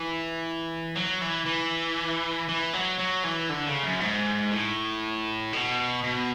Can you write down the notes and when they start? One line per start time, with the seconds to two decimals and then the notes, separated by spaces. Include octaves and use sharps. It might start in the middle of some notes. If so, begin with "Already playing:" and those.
Already playing: E3
0.96 F#3
1.21 E3
1.46 E3
2.48 E3
2.73 F#3
2.99 F#3
3.24 E3
3.50 D3
3.67 C#3
3.83 F#2
4.00 G#2
4.51 A2
5.53 B2
6.03 B2